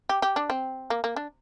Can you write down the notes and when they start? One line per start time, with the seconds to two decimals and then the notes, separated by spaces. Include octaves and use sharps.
0.09 G4
0.22 G4
0.36 D4
0.50 C4
0.90 A#3
1.04 A#3
1.16 D4